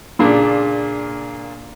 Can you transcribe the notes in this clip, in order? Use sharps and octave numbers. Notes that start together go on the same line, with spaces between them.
A#2 C#3 A#3 D4 F4